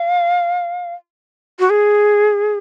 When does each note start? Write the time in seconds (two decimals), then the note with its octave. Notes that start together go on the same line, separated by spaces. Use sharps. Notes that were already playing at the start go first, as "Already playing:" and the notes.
Already playing: F5
1.59 F#4
1.70 G#4